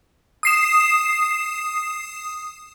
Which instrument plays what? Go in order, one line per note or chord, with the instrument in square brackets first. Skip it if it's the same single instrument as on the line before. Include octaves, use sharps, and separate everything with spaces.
[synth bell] D#6 C7 E7